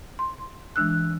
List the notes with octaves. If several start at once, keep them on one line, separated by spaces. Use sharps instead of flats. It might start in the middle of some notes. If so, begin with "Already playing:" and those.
C6
E3 G#3 D4 E6 F#6